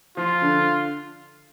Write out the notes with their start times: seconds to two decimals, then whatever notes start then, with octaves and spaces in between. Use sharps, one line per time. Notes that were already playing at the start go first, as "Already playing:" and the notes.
0.17 F3 F4
0.42 D3